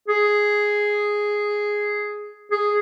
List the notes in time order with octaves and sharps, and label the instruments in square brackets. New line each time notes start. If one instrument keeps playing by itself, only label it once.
[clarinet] G#4
G#4